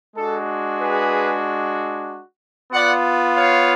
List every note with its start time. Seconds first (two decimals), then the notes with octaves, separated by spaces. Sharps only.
0.16 G#3 D4 F#4 A4
0.80 G#4 B4
2.72 B3 F4 D5 F#5
3.36 C#5 F5